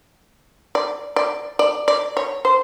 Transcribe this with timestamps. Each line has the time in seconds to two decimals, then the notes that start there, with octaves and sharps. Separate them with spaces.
0.75 D5
1.16 D5
1.59 D5
1.88 D5
2.17 C#5
2.45 C5